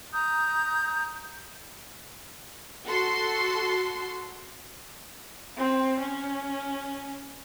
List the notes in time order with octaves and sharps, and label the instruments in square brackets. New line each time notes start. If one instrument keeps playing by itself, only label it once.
[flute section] A#5 D#6 G6
[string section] F#4 A4 C6
[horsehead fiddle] C4
C#4